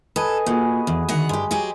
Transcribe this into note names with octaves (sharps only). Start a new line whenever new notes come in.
A4 B4 D#5 G#5
A#2 F#4 G#4
E2
D2 D#3 F#5
G2 G#3 G4
F#3 G4 G#4